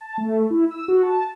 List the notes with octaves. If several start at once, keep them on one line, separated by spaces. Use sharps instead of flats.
A5
A3
E4
E6
F#4
A5